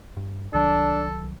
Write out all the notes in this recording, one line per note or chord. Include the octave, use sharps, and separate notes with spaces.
G2
C2 D#3 F#3 D4 A4